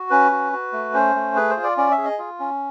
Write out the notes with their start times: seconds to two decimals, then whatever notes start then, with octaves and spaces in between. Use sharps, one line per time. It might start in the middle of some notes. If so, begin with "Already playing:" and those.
Already playing: F#4
0.10 C#4 B4
0.31 F#4
0.53 F#4
0.73 A3
0.94 C#4 C5
1.15 A3
1.36 G#4 B4
1.50 C5
1.57 F4
1.63 D5
1.77 C#4 D5
1.91 E5
1.98 G#4
2.05 D#5
2.18 F4
2.40 C#4